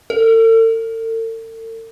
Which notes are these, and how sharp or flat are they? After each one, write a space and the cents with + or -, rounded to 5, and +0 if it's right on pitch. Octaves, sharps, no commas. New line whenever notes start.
A4 +45